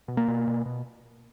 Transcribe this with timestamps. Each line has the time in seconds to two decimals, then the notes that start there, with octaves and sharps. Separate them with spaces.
0.08 B2
0.17 A#3
0.28 B2
0.47 B2
0.66 B2